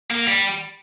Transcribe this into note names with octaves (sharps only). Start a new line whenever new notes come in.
A#3
G3